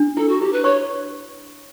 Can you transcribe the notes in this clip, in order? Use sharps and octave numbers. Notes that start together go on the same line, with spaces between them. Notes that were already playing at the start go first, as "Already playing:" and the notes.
Already playing: D4
E4 A4
F#4
E4 G4
B4
C#5 C#6